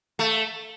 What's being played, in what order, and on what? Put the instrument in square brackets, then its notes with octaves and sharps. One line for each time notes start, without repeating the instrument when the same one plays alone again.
[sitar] A3